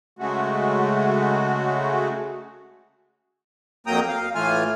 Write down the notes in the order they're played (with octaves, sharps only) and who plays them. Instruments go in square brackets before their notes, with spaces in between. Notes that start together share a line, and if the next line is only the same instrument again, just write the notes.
[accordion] C#3 G#3 A3 F#4
F2 F#3 A#3 G5 A#5 D#6
F5
A2 E3 A3 F4 G#5 F6